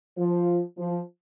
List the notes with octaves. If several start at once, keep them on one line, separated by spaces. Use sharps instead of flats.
F3
F3